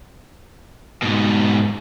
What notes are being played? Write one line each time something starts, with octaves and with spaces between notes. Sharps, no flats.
G#2 B2